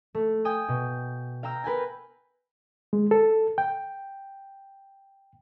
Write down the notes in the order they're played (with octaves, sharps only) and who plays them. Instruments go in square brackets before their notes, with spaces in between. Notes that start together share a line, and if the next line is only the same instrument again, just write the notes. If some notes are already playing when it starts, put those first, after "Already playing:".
[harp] A3
G5 G#5 D#6
B2
F5 G5 A#5 E6
A#4 B4 G5 G#5
[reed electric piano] G#3
A4
G5